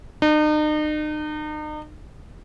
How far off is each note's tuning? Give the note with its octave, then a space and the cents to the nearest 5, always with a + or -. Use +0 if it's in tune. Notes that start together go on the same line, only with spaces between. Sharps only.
D#4 -40